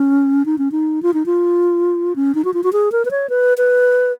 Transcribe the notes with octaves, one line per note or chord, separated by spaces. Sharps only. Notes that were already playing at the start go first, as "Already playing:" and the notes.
Already playing: C#4
D#4
C#4
D#4
F4
D#4
F4
C#4
D#4
F#4
F4
F#4
G#4
A#4
B4
C#5
B4
B4